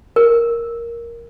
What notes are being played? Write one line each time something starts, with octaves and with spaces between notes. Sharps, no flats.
A#4